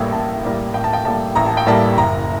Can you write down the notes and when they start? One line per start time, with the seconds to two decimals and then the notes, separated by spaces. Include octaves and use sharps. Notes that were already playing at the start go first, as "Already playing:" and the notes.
Already playing: A1 A2 G3 A#3 G5
0.12 A1 A5
0.43 A2 G3 A#3
0.74 A1 G5
0.84 A5
0.93 G5
1.05 A2 G3 A#3 A5
1.35 A1 A#5
1.46 A5
1.57 G5
1.66 A2 G3 A#3 A5
1.97 F#1 A#5